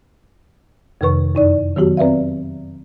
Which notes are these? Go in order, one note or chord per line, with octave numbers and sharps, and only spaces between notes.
F2 C3 D#3 B4 C#6
F#2 D#4 D5
D#3 F#3 B3 F#4 G4
C4 B4 D5 E5 F5